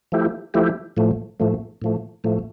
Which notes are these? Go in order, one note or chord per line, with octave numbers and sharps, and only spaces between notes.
F3 A3 E4 G4
F3 A3 E4 G4
A2 F3 A3
A2 F3 A3
A2 F3 A3
A2 F3 A3